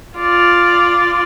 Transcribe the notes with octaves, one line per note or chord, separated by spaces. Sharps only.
F4 D5